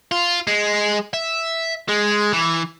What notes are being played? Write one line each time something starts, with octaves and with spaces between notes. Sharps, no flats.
F4
G#3
E5
G#3
E3